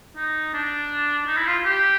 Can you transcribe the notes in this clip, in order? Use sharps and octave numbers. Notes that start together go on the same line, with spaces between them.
D#4
D4
D#4
E4
F4
G4